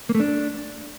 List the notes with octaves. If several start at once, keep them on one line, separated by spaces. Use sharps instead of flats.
A#3
A3
D4